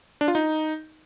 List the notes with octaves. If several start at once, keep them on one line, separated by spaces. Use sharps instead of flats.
D4
F4
D#4